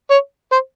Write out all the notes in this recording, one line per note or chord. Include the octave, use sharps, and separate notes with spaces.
C#5
C5